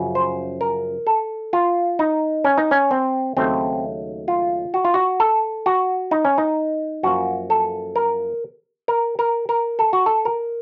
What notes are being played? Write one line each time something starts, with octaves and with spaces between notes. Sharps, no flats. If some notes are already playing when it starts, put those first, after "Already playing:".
Already playing: F#2 C#3 F3
C5
A#4
A4
F4
D#4
C#4
D#4
C#4
C4
D#2 C#3 F#3 A3 C4
F4
F#4
F4
F#4
A4
F#4
D#4
C#4
D#4
F#2 F3 A#3 F#4
A4
A#4
A#4
A#4
A#4
A4
F#4
A4
A#4